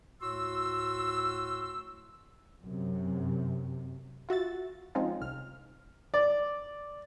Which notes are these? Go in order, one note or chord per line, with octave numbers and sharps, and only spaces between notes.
D2 A2 F#4 C6 E6
F#2 C3
F4 F#4 E5 A6
F3 G#3 C4 C#4 D#4 F4
C2 F6
D5